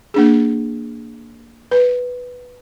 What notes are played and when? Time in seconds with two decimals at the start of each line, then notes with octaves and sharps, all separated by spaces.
0.14 A#3 D4 G#4
1.71 B4